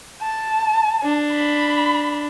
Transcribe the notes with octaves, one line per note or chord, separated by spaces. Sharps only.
A5
D4
B5